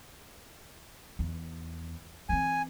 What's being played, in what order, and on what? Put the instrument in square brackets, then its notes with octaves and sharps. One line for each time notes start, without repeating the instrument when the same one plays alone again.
[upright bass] E2
[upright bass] E3 C4 [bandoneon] G#5